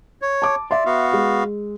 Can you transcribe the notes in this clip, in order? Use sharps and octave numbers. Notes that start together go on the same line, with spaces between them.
C#5
A5 D6
D5 E5 C6
B3 F#4 F5
G#3